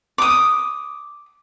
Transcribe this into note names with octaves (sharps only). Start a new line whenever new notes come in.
D6 D#6